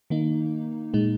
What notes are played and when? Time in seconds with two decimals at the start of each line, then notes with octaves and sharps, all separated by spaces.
0.10 D#3 A#3 D#4
0.94 A#2 G#3 D#4